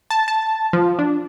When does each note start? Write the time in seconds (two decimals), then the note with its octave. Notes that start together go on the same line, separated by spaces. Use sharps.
0.10 A5
0.28 A5
0.73 F3
0.99 D4